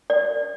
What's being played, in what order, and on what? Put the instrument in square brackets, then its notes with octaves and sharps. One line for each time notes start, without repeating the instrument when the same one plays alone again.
[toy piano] D5